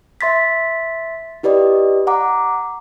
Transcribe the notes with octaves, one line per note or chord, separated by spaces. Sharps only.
E5 C6 A6 B6
E4 G4 B4 D5 D#5
F#5 A#5 D6